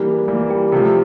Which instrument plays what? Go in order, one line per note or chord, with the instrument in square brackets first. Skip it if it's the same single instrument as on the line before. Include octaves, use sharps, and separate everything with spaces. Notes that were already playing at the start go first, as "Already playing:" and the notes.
Already playing: [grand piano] E3 G3 A#3 [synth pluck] G4 A#4
[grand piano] E3 G3 A#3
[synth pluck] G4
[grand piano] C3 F3 A3 [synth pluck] G4